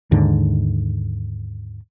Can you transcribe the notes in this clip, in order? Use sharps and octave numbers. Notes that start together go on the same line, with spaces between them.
D#2 G#2 D3